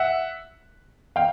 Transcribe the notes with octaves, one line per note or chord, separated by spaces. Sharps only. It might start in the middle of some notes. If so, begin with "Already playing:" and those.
Already playing: E5 F#5
F5 G5